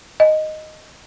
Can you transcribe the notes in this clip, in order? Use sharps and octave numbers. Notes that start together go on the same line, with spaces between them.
D#5